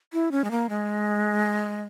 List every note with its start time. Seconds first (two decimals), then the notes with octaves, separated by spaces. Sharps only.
0.13 E4
0.32 C#4
0.44 G#3
0.51 A#3
0.69 G#3